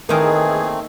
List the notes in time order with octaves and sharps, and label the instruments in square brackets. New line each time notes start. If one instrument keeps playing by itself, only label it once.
[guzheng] D#3 D#4 [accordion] E3 G#4 [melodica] A3 C4 [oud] A#3